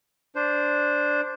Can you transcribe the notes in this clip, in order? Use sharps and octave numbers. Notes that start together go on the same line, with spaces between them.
D4 C5